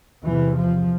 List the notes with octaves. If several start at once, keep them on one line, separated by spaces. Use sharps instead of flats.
E2 C3 E3
F3